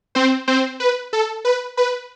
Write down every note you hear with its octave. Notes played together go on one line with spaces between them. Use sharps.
C4 C5
C4 C5
B4
A4
B4
B4